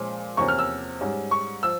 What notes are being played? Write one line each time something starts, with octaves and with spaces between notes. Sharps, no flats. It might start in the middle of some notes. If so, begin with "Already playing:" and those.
Already playing: A#2 F3 G#3 C#4
E2 C3 F3 A#3 C#4 C#6
F6
E6
G#2 G3 C#4
C#6
F3 E6